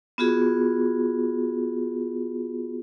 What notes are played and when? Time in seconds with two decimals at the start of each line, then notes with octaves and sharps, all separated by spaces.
0.18 B3 F4 F#4 G#4